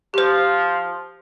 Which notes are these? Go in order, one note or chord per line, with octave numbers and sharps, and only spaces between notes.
F3 G4 C5